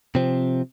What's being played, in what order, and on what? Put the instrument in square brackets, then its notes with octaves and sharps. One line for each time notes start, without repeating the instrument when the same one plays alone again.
[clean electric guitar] C3 F3 C4